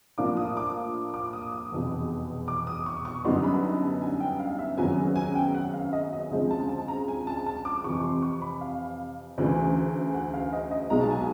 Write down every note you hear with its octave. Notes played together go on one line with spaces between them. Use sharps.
A2 F3 A#3 D4 F4 D6
D#6
D6
D6
D#6
D#6
F1 E2 B2
D6
D#6
C#6
C#6
F#2 D3 G3 B3 D#4 C6
B5
B5
A5
G#5
G5
F5
E5
G#1 F#2 C#3 F#3 B3 G#5
G#5
G5
F#5
F5
D#5
D#5
D2 C#3 F3 G#3 C4 D#5
A5
A5
A#5
G#5
A5
A5
D6
F2 C3 E3 C#6
C6
C#6
B5
F5
D2 C#3 E3 A3
F#5
F5
D#5
D#5
B1 B2 G#3 B3 D#4 A#5
A5
G#5